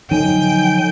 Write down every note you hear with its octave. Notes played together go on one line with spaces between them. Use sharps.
D3 F3 F#3 D#4 G5 G#5